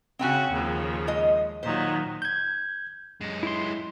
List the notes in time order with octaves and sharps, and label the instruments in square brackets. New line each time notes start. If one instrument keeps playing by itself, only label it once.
[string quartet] C#3 F#4 [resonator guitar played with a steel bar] C4 G5 G#5
[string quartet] D#2 C#3 F3
[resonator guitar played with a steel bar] G#3 D#5
[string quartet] A#2 D#3 F#3 [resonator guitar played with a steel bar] C5
[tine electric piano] G6 G#6
[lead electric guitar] F#2 G#3
[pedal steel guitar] E4 C6